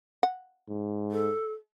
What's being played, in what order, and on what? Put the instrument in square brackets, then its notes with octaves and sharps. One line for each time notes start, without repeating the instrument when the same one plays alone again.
[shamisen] F#5
[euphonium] G#2
[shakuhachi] A4